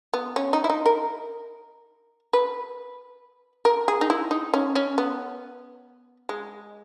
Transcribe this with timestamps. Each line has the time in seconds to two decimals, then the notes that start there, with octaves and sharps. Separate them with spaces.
0.14 B3
0.36 C#4
0.53 D#4
0.64 E4
0.70 D#4
0.86 A#4
2.33 B4
3.65 A#4
3.88 G#4
4.01 D#4
4.10 E4
4.31 D#4
4.54 C#4
4.75 C#4
4.98 B3
6.29 G#3